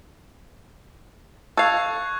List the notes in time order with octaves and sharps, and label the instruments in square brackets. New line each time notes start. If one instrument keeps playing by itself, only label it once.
[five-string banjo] A4 F5 [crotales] C#6 F#6 G#6